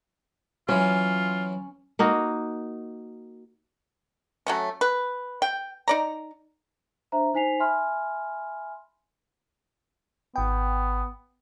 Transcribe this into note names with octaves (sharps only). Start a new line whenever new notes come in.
E3 F#3 C#4 F4
A#3 D#4 F#4
F#3 A3 C#4
B4
G5
D#4 D5 A#5
D4 C5 E5 A#5
D#4 C5 G#5 B6 C7 F7
E5 G#5 B5 C6 F6
G#1 B3 G5